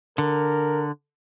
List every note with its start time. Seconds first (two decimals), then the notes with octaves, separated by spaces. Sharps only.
0.18 D3 A#4